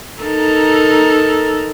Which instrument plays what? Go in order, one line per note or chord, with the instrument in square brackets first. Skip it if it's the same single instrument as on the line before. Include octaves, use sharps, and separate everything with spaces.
[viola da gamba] D#4 A4 A#4